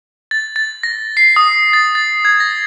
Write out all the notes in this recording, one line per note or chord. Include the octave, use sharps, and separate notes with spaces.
A6
A6
A#6
C7
D#6
A6
A6
G#6
A#6